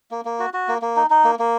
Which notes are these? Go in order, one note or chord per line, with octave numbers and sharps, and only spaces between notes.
A#3
A#3
F#4
F#4
A#3
A#3
D#4
D#4
A#3
A#3